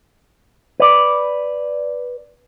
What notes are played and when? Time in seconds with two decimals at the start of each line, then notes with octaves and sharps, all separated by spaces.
0.80 B4 D5